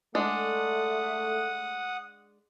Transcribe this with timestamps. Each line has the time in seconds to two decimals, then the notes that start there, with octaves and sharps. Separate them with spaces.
0.15 G#3 A3 D4 F#5 D#6